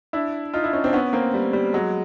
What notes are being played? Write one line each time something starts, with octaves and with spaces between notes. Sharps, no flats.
D4 E4
D#4 F4
D4 E4
C#4 D#4
C4 D4
B3 C#4
A#3 C4
G3
G3
F#3 G#3